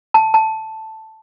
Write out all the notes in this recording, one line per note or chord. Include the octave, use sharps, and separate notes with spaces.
A5
A5